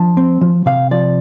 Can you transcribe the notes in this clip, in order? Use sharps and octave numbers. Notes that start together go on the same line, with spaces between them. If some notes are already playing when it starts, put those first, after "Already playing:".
Already playing: F3 D4 A5
C4
F3
C3 F5
F3 D5